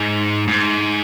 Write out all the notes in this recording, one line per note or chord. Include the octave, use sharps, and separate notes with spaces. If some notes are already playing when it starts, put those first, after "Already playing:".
Already playing: G#2
G#2